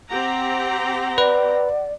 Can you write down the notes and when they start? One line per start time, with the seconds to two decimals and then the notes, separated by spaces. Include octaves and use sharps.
0.11 C4 G4 F#5 A#5
1.18 B4 D5